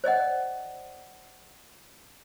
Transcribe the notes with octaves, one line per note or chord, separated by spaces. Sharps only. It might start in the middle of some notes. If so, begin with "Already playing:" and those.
C5 D5 D#5 F#5